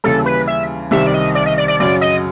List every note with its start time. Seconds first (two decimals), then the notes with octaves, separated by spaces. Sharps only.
0.04 D#2 C#3 E3 G3 A4
0.26 B4
0.48 E5
0.91 C2 C3 D#3 G3 C4 E5
1.07 D5
1.14 D#5
1.35 D5
1.46 D#5
1.58 D5
1.68 D5
1.80 F#2 C#3 F#3 D5
2.01 D#5